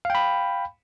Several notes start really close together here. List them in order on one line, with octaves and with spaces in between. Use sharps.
F5 G5 B5